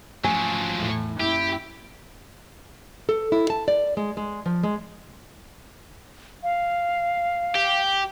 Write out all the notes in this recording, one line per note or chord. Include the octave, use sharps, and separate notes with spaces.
G#2 F3 F#3 A3 C#4 G#5
E2 A2
F#2 A#3 C#4 E4 G4
A4
E4
A5
D5
G#3
G#3
F3
G#3
F5
G4